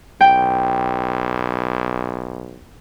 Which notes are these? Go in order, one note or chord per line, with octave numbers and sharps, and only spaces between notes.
B1 G5